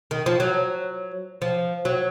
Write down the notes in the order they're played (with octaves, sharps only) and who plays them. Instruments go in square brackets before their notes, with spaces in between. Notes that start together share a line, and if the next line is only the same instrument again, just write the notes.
[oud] D#3
F3
F#3
F3
F#3